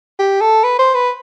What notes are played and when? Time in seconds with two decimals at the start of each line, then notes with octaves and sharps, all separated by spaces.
0.19 G4
0.41 A4
0.64 B4
0.79 C5
0.94 B4